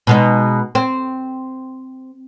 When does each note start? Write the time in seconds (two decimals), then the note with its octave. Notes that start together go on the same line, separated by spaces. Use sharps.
0.07 B2 G#3 D#4
0.75 C4